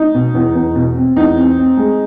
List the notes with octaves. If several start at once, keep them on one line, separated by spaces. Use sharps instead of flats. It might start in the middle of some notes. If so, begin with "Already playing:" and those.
Already playing: D#4
B2
E2
E2
B2
C4
E2 D#4
C4
C4
G#3